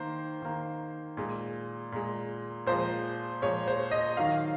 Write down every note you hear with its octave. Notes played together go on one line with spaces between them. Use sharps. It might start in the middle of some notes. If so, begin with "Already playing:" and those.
Already playing: D#3 A#3 C5
D#3 A#3
A#2 G#3
A#2 G#3
A#2 F3 G#3 C5
A#2 F3 G#3 C#5
C5
D#5
D#3 F#3 A#3 F5